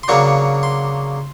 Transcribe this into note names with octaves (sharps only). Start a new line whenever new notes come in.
C6
C#3 F#3 A#3 D4 C#6
C6